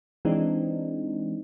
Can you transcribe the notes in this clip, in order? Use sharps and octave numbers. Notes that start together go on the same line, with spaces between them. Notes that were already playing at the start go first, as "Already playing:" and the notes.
E3 G#3 C4 D4 D#4